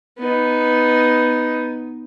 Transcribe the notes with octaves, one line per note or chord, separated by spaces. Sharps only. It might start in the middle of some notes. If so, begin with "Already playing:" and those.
B3 D#4